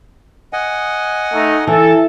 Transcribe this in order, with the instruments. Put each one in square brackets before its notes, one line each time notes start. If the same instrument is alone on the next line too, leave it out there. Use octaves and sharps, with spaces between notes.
[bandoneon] D#5 F#5 G#5
[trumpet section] A3 D#4
[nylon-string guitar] E3 [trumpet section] A4